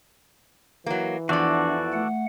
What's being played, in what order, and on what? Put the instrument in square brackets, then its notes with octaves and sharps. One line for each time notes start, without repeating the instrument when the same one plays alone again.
[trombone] E3 [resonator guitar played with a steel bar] F#3 A#3
[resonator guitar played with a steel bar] E2 F3 [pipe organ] D4 [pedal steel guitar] F#4 A4 D5
[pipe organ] A3 F#5